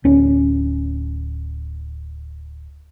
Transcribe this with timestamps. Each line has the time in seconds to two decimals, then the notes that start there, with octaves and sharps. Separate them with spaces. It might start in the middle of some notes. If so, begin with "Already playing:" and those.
0.04 D1 C#4